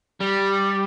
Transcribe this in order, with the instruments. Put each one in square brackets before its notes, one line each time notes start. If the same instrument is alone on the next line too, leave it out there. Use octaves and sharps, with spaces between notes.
[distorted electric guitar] G3